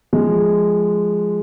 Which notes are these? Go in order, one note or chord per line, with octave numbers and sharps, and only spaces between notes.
F3 G#3